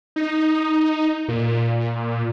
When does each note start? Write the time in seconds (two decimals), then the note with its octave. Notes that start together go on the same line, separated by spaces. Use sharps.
0.16 D#4
1.28 A#2